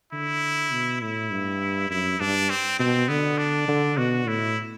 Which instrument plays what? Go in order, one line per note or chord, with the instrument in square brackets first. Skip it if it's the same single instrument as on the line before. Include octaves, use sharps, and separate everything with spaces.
[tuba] D3 [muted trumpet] E4
[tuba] B2
[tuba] A2 [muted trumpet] E4
[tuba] G2
[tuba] F#2 [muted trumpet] E4
[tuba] G2 [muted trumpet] D4
[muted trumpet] C4
[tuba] B2 [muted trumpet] C4
[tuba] D3 [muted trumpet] B3
[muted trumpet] D4
[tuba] D3
[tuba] B2 [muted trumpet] F#4
[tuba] A2 [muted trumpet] E4